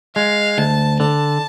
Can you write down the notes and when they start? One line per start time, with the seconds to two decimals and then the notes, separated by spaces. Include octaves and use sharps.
0.15 G#3 F5
0.58 D2 A5
0.99 D3 A5